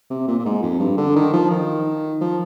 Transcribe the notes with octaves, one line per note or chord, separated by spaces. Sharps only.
C3
A#2
A#2
G#2
F2
G2
D3
D#3
F3
D#3
F3